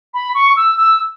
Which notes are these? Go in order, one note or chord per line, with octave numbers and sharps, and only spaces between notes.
B5
C#6
E6
E6